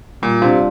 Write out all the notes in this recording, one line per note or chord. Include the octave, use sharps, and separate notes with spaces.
A#2 G3
C3 D4 F4